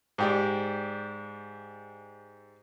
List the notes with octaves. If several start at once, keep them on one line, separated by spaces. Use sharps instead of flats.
G#2 G4 D5